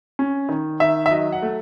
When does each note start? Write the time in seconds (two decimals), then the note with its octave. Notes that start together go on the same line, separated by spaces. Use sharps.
0.19 C#4
0.49 D#3
0.80 D#3 E5
1.06 E5
1.11 F#3 D#5
1.32 F#5
1.42 A3